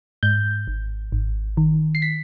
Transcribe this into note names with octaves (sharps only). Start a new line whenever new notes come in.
G#2 G6
G#1
G#1
D#3
C7
B6